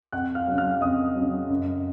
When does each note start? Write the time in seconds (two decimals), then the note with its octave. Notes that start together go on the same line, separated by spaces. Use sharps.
0.13 F2 F#5 F#6
0.35 F5 F6
0.47 C#3 F#3
0.58 F5 F6
0.81 F2 D#5 D#6
1.15 C#3 F#3
1.50 F#2